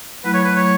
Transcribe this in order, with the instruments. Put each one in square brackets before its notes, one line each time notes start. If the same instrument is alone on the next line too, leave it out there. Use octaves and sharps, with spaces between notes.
[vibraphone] F#3 A3 E4 [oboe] B4
[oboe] C#5
B4
C#5